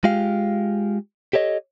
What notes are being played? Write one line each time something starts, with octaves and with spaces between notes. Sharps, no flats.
G#3 F4 G4 F5
G4 A4 C#5 D#5